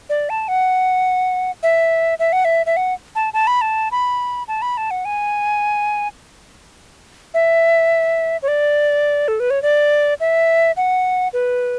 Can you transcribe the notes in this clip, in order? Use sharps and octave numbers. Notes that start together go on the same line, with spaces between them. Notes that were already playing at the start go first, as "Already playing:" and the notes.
D5
A5
F#5
E5
E5
F#5
E5
E5
F#5
A5
A5
B5
A5
B5
A5
B5
A5
F#5
G#5
E5
C#5
D5
A4
B4
C#5
D5
E5
F#5
B4